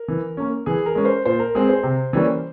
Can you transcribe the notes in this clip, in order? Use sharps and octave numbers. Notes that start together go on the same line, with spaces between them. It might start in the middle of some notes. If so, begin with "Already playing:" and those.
Already playing: A#4
E3
A#3 C#4
E3 G#4
A#4
G#3 C#4
C5
A#2 C5
A#4
G#3 C4 G#4
C5
C3
E3 G3 A#3 C#4